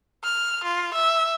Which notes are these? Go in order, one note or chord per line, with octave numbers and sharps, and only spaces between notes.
F6
F4
E5